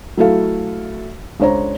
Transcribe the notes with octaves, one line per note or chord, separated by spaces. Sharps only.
F#3 A3 E4 F#4 A4 F5
C#2 D4 C5 C#5 A#5